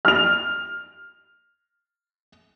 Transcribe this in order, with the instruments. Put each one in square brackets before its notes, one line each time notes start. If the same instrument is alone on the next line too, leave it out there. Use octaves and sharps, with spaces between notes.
[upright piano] F6 F7